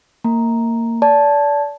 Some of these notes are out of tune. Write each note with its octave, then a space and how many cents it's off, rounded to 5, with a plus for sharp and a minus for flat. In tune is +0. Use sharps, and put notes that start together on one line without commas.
A#3 -20 A#5 +0
D5 -30 A5 -10